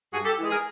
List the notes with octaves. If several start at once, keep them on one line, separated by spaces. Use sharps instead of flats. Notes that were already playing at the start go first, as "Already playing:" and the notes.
G2 F#4 G#4
G4 A4
E3 G#3
G#4 A#4